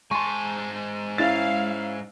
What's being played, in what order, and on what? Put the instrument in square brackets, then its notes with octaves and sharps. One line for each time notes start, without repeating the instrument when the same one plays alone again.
[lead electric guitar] G#2 G#5 [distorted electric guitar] G#3 A5 [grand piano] C6 C#6
[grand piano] C#4 E4 A6 [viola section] F5